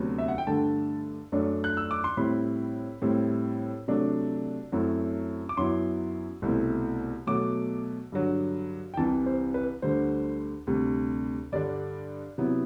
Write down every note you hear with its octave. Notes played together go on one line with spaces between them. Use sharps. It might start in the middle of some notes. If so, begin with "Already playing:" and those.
Already playing: D2 C3 F#3 B3
E5
F#5
G5
G2 D3 A3 A5
F#2 F#3 A3 D4
F#6
E6
D6
C6
A2 G3 C4 E4 B5
A2 G3 C4 E4
C3 F#3 A3 D4
F#2 F#3 A3 C4 E4
D6
F#2 F#3 B3 E4 C6
C2 B2 A3 C4 E4
B2 F#3 A3 D6
G2 D3 F#3
G5
C2 C3 E3 A5
C5
B4
D2 D3 G3 C5
D2 C3 G3
G2 D3 G3 D4 D5
C3 F#3 B3 E4